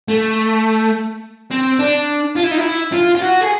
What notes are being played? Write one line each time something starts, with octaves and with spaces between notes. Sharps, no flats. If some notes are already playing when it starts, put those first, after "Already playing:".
A3
C4
D4
F4
E4
D#4
E4
F4
F4
F#4
G#4